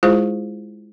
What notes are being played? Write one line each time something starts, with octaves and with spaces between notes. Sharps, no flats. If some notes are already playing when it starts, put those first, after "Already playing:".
G#3 E4 F4 G#4 C5